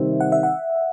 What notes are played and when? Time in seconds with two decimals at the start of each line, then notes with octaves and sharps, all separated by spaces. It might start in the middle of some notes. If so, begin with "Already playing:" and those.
Already playing: C3 D#3 G3 C4 E5
0.21 F#5
0.32 E5
0.43 F#5